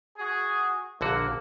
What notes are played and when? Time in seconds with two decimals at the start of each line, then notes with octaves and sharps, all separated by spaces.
0.17 F#4 G#4
1.01 A#1 D3 A#3 F#4